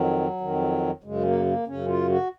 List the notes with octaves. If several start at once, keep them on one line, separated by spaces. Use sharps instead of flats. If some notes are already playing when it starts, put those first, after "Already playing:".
Already playing: F2 D#3 F#3
F2 D#3
F#2 C#3 G#3
A#3
A#3
F#2 C#3 C#4
F4
F#4